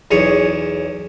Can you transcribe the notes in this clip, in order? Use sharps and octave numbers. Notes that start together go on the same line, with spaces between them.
B1 E2 G#4 C#5